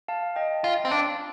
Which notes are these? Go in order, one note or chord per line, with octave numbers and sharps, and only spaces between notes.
F5 A5
D#5 G5
F4
C4
D4